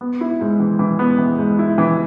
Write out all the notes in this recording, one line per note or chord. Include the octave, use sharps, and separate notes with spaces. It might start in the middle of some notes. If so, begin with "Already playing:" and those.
B3
E4
G#2
E3
E3
B3
E3
G#2
E4
E3